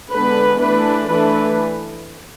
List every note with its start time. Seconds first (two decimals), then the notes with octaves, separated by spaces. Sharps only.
0.12 D3 G#3 B3 D4 B4
0.60 E3 A3 D4 B4
1.09 E3 A3 D4 B4